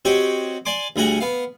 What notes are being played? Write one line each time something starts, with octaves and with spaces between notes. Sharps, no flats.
C4 F#4 G4 C#5 D#5
D5 G#5 C6 D6
D2 G3 G#4 F#5 A#5
B3 F5